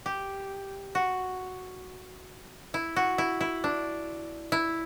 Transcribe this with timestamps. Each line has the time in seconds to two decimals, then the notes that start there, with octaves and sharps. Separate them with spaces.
0.06 G4
0.95 F#4
2.74 E4
2.96 F#4
3.18 E4
3.41 E4
3.64 D4
4.52 E4